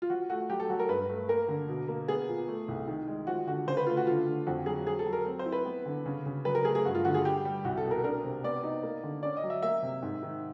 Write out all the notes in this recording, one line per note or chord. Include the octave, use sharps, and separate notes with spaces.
F4
F3 F#4
A3 F#4
F#3 G4
A4
F#3 F#4
A#4
G2 B4
A3
A#3 A#4
D3
B2
A#3
B3 G#4
A#2
A3
C2
D#3
G#3
F3 F#4
D3 F#4
C#3 C5
B4
A3 F4
F#4
D3 F4
D3
F2 F#4
F#3 G#4
F#3 G#4
A4
F#3
A#4
C4
C5
E4
B4
B3
D3
C#3
C#3
F#3 B4
A#4
A3 G#4
G#4
G2 F#4
F4
D3 F#4
G#4
G3 G4
G3
C2 F#4
A4
B2
A#4
D4 A#4
C3
B3 D5
D#4
A#3
D3
C#4 D5
D#5
F#3
E5
A#3 E5
C3
G#2
D#3